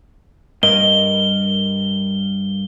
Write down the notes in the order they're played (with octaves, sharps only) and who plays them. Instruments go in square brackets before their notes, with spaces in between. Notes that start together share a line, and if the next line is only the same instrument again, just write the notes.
[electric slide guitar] G2 A#4 D#5 [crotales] G7